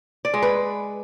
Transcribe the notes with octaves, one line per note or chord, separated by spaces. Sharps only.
D5
G#3
B4